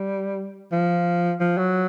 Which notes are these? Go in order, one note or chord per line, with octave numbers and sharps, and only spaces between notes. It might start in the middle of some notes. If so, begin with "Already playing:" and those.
Already playing: G3
F3
F3
F#3